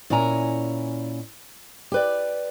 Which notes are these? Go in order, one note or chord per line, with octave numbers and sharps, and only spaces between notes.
A#2 C#4 E4 G#5 A#5
G4 B4 D5